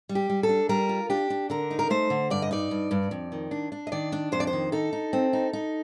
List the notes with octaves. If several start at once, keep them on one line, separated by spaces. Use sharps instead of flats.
G3
G4
G3
A4
D4
G3 A#4
F4
D4 G4
D4
D3 A#4
D#4
A#4
A3 C5
D3
G2 D5
D#5
D#4 D5
G2
G2
F2
D#3
D4
D4
D#5
D#3 D5
D4
F2 C5
D5
C5
D#3
D#4 A4
D#4
C4
D#4
D#4